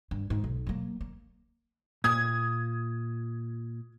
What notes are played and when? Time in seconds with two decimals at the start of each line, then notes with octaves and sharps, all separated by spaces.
0.11 G2
0.30 G#2
0.44 B1
0.67 F#3 A#3
1.01 A#3
2.04 A#2 D#6 G#6